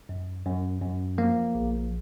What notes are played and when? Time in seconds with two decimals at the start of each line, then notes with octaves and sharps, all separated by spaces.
0.09 F#2
0.46 F#2
0.81 F#2
1.18 F3 A#3
1.55 A#1